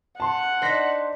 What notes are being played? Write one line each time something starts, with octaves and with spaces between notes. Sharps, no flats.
F#5 A5 C6
D4 D#4 C5 A#6 B6